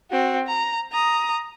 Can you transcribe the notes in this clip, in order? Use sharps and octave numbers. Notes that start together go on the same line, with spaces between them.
C4 F#4
A#5
A#5 D#6